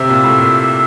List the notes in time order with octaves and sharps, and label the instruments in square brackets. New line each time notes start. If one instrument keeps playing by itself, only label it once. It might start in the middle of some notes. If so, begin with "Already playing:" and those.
Already playing: [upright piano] C3 [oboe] E5
[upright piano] A#2
A2
A#2